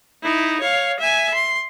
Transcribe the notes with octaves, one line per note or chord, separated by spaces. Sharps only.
D#4 E4
C#5 F5
E5 G#5
C6